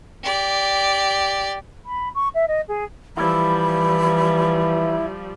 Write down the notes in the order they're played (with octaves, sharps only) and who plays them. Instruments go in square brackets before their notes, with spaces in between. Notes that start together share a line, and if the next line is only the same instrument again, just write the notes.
[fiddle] G4 D5
[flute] B5
C#6
E5
D#5
G#4
[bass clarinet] E3 [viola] F3 G3 [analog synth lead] E4 [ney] B5